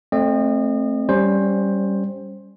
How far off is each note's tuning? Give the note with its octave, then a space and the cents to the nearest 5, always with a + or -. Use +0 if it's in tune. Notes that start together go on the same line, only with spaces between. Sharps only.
A3 +0 C4 +20 D#5 -35
G3 +0 C#4 +0 C5 +15